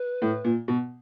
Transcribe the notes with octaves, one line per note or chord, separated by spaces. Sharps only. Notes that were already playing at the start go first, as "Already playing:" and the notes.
Already playing: B4
A2
A#2
B2